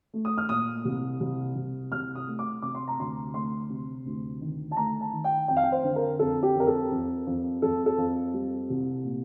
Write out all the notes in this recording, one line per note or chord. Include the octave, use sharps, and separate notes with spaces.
A3
D#6
F6
A#2 D#6
C2
C2
C2
C2 F6
D#6
A3
D6
C3 D6
C6
A#5
D2 C6
A3 C6
C3
D2
D#3
A5
A3 A#5
A5
D#3
G5
F2 G5
F5
G5
C5
D3
A#4
F2 A4
G4
F2 A#4
A4
F2
F2
F2 A4
A4
F2
G3
C2
A#2